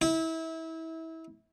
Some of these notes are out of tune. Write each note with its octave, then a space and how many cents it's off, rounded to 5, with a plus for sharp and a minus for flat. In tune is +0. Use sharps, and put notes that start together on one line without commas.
E4 -25